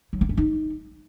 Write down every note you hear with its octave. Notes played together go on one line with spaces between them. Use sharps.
F#3
A#3
C#4
D#4